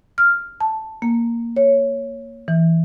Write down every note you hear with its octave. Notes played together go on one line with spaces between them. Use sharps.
F6
A5
A#3
C#5
E3